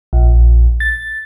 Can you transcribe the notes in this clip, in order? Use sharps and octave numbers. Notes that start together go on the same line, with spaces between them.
A#1
A6